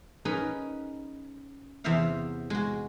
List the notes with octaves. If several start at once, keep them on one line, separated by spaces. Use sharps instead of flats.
C#4 D#4 G#4 A#4 B4
E2 C3 C5 E5 F5
G#3 F#4